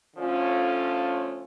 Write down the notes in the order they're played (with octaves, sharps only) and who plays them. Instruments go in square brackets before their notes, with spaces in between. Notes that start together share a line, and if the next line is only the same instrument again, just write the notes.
[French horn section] D3 F3 A3 C#4 F4